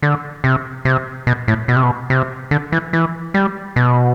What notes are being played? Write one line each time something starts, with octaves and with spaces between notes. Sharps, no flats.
D3
C3
C3
B2
A2
B2
C3
B2
C3
D3
E3
E3
G3
B2